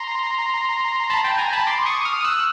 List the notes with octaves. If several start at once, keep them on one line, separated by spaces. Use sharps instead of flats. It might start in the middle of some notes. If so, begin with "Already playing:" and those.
Already playing: A#5 C6
A5 B5
G5 A5
G#5 A#5
A5 B5
C6 D6
C#6 D#6
D#6 F6
E6 F#6